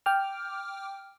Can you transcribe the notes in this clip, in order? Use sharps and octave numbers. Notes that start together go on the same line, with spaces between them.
G5 D6 F6